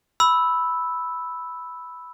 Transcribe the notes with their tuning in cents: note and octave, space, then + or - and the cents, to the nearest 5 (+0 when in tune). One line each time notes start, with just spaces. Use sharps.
B5 +0 E6 -5